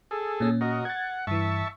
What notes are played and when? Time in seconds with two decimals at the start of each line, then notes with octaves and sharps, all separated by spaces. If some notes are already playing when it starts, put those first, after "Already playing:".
0.11 G#4 A4
0.40 A#2 C#4
0.61 F#4 A#4 D#5
0.85 F#5 G#6 A6
1.27 G2 E3 E5 A5 C#6